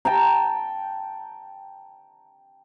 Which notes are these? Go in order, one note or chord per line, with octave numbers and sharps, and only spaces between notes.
G5 A5 A#5